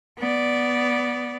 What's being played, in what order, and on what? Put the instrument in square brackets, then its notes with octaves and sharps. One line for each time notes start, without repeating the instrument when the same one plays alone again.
[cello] B3 D5